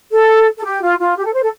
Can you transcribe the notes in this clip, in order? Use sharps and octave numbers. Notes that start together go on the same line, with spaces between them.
A4
A4
G4
F4
F4
G4
A4
C5
A4